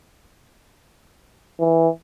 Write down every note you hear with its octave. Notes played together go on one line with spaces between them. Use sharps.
E3